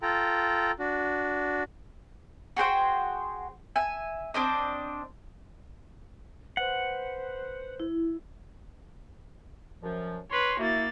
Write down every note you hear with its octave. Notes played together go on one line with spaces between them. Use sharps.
F4 A4 G5 A#5
D4 F#4
F#4 G#4 C5 G5
E5 G#5
C4 D4 C5 D#5
B4 C5 F#5
E4
F#2 F3
B4 C#5 C6
A#3 E4 F#4 A6